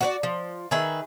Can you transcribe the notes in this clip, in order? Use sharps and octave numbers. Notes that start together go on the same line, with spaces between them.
F#4 B4 D5
F3
D#3 G#4 B4 E5